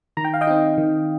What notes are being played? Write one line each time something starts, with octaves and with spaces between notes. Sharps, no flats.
D#3 A#5
G5
F5
D#5 G5
C4 D#4
D#3